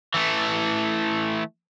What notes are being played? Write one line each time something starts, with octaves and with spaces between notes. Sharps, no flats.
E3 A3